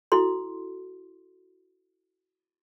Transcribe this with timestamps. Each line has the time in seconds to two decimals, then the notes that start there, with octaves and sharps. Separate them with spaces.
0.12 E4 F#4 A4 C6